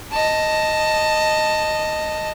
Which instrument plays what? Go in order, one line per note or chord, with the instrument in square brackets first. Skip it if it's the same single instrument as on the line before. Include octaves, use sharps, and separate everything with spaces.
[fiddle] D#5 A5